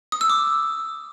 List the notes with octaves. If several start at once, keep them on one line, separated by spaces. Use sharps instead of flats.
D#6
E6
D6